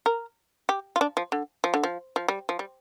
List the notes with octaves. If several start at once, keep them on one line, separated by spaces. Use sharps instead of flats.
A#4
G4
F4
D4
F3
D3
F3
D3
F3
F3
G3
F3
G3